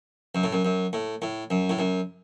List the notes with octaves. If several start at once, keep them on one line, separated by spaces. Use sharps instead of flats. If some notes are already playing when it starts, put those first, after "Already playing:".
F#2
A2
F#2
F#2
A2
A2
F#2
A2
F#2